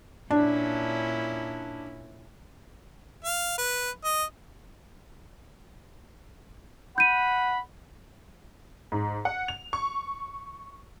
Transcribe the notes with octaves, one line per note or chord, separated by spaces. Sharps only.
A#2 C#4 D4 E4
F5
B4
D#5
F#5 B5 G6 D#7
G#2
F#5
F7
C#6